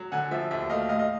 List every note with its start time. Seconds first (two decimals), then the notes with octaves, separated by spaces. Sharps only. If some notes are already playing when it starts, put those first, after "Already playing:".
Already playing: F#3
0.12 D3 F#5 G#5
0.31 F3 E5
0.51 D#2 E5
0.70 A3 D#5 F5
0.89 A2 D#5 F5
0.99 D#5